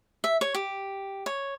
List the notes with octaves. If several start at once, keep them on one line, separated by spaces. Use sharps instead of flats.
E5
C#5
G4
C#5